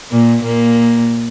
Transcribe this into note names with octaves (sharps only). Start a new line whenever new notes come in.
A#2 A#3
A#2 A#3